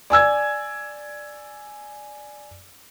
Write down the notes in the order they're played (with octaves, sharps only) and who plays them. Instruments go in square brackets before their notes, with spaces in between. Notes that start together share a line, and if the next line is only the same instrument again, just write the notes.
[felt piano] D5 G#5 E6 G#6